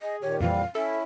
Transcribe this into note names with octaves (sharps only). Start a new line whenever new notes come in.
G#4 D#5
A#2 D#3 G4 C#5
F2 A#2 E3 G3 C4 F5
C#4 E4 A4 E5